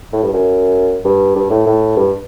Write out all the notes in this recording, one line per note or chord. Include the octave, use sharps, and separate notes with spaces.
A2
G2
F#2
G2
G2
A2
A2
G2